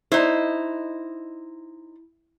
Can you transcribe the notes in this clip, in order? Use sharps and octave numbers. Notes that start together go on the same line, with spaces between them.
D#4 E4 C5